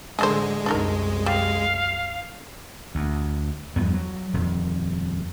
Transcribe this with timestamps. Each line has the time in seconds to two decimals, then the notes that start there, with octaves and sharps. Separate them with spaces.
0.19 A2 D3 G#3 G#4 A4 C5
0.66 C2 F#2 D4 D#4 A#4
1.26 G3 F5
2.95 D2
3.76 E2 G2 F3 B3
3.94 F#3
4.34 D#1 F2